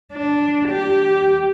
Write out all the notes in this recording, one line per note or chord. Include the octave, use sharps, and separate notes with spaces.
D4
G4